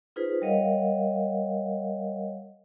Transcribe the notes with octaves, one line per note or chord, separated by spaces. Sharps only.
D#4 F4 G#4 B4 C5
G3 A#4 C#5 D#5 F5 F#5